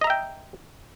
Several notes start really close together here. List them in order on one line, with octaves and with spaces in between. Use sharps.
D#5 A#5 E5 G5